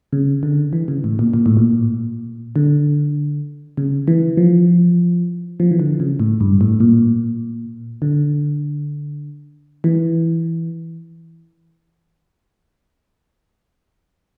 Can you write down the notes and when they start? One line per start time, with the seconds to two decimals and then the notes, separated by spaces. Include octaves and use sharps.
0.13 C#3
0.43 D3
0.73 E3
0.88 C#3
1.04 A2
1.19 A#2
1.34 A#2
1.46 A2
1.57 A#2
2.56 D3
3.77 C#3
4.08 E3
4.37 F3
5.60 F3
5.71 E3
5.80 D3
6.00 C#3
6.20 A2
6.40 G2
6.61 A2
6.80 A#2
8.02 D3
9.84 E3